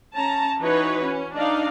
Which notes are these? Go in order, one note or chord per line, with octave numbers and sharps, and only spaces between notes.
C#4 A5 A#5
E3 D#4 F#4 B4 C#5
C#4
D4 D#4 D5 F5